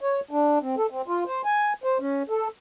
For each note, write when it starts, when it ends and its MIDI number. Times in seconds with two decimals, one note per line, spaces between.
0.01 0.20 73
0.31 0.59 62
0.61 0.75 60
0.78 0.87 69
0.90 1.02 60
1.07 1.24 65
1.27 1.42 72
1.45 1.73 80
1.84 1.98 72
2.00 2.23 61
2.29 2.48 69